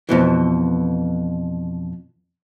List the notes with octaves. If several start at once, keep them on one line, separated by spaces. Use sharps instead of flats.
F2 B2 E3